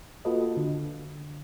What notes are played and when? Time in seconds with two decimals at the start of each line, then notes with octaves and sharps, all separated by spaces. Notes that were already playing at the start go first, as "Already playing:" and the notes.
0.25 A#3 F4 F#4 A4 B4 D#5
0.57 D3